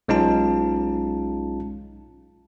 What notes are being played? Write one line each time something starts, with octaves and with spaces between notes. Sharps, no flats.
B1 G#3 C#4 D#4 F4 A5